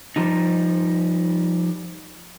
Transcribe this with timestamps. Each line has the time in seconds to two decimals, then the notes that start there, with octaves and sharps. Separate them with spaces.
0.16 F3 G3 D#4